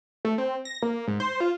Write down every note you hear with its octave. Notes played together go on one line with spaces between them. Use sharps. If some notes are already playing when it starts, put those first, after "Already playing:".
A3
C4
A#6
A#3
G#2
C5
F4